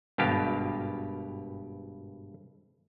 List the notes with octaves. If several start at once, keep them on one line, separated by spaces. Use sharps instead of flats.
G#1 G2 B2 G4 F5